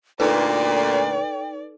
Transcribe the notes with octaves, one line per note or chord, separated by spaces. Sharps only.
D2 A#2 D#4 A4 B4 D5 G5